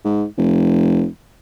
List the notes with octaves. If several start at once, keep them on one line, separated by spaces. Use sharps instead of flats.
G#2
F1